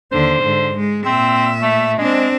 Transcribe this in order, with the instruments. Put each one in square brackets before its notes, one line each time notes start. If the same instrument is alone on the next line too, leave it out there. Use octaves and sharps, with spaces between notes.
[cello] D#2 D3 [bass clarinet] C5
[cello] G#2 D3
G#3
[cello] A#2 E5 [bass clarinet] C4
[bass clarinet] A3
[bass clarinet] G#3 [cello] C4 D4